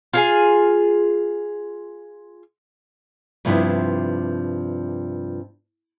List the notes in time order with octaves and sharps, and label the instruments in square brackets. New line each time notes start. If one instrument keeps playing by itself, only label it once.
[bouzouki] F4 G#4 G#5
[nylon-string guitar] G2 C3 F3 B3 D4 E4